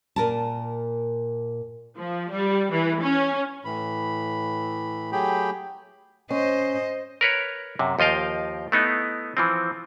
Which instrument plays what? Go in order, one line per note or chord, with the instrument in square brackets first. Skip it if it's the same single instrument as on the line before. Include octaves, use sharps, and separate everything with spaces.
[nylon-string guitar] A#2 A#4 A5
[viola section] F3
G3
E3
C#4
[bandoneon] A2 E3 B5
F#3 A3 G4 G#4 G5 B5
[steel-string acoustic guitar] C#4 [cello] C5 D#5
[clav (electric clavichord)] A#4 B4 C#5
F#2 C3
D#2 F3 D#5 F5 G5
A3 B3 D#4 E4
E3 F3 C4